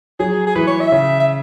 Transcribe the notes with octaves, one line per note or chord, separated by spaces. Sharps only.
F#3 G#4
G#4
E3 B4
C#5
E5
C#3
E5